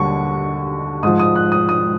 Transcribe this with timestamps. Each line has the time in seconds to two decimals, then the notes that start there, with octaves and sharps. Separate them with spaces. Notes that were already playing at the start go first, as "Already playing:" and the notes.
Already playing: D#2 D3 G3 C#6
1.03 G#2 D#6
1.07 F3
1.19 D#6
1.35 F#6
1.52 D#6
1.69 D#6